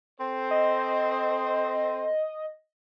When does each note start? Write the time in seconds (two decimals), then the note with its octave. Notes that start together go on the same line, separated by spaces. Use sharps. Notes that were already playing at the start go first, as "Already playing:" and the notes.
0.21 C4 A4 C5
0.51 D#5